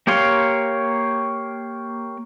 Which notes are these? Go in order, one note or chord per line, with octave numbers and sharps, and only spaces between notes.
A#3 G4 C#5 F5 C6